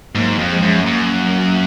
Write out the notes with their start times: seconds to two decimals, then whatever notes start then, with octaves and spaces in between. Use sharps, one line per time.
0.15 G#2 F#3 A#3
0.39 F2
0.51 F3 G#3
0.62 F#2
0.85 F#2 F#3 A#3